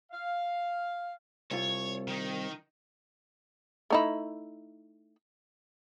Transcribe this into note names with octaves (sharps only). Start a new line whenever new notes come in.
F5
C2 F4 C#5
D#3 D#4
A3 D#4 E4